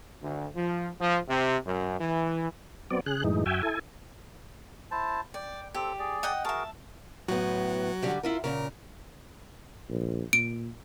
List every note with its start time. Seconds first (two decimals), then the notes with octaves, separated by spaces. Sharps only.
0.22 D2
0.56 F3
1.00 F3
1.29 C3
1.66 F#2
2.00 E3
2.91 F#3 B3 C4 D5
3.06 C#3 G#4 F#6
3.24 F#2 A2 E3 G#3 D#4
3.46 F#2 F#4 E5 G5 G#5
3.63 E4 A4 G#5
4.91 E4 C5 A5
5.34 D5 G5
5.75 C4 G4 A4
5.99 G#4 D5
6.23 D#5 F#5 G5
6.45 F#4 G#4 A#4 E5 A5
7.28 A2 F#3 B3 F#4
8.02 D3 G3 G4
8.23 E4 F4 A#4
8.44 A#2 C#3 A#4
9.89 A#1
10.33 A#2 D7